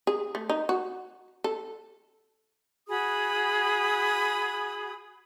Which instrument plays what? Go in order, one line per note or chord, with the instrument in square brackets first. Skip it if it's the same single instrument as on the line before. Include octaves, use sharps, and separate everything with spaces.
[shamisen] G#4
A3
D#4
F#4
A4
[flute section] F#4 G#4 B5 D#6